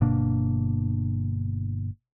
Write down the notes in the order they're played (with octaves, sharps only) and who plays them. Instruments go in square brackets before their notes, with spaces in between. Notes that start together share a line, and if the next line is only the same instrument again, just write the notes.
[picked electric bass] G1 B2 A#3 D4